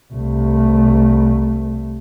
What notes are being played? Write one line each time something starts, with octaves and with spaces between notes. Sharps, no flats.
C2 A3